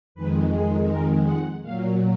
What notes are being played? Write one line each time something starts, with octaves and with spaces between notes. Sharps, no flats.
F2 D#3 G#3 B4
G#4
A#4
F#5
A#2 F#3 F5